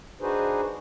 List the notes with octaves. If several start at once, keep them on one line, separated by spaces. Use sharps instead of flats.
D4 D#4 F#4 G#4 B4 C5